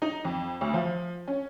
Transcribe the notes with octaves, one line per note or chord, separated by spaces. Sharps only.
D#4
F2
D2
F3
C#4